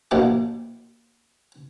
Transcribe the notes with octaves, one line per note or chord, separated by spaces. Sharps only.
A#1 B2 A#3 E4 G5 D6